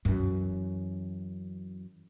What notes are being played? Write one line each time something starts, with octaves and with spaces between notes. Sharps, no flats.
F#2 E3